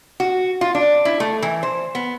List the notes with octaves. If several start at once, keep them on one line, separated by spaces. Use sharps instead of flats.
F#4
F4
D4
E4
A3
E3
C5
B3